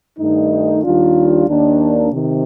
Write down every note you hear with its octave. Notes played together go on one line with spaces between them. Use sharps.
G2 D#3 A3 D#4
D#2 D#3 G3 D4 F4
D#2 D#3 A#3 D4
C3 D#3